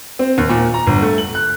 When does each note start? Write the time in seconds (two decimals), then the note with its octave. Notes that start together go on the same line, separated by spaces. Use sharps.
0.19 C4
0.38 D#2
0.49 A#2
0.74 A#5
0.87 G1
1.02 A3
1.18 F#7
1.35 F#6